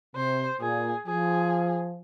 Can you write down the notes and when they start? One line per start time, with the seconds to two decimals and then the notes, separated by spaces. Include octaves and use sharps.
0.16 C3 C5
0.61 A#2 G#4
1.07 F3 G#4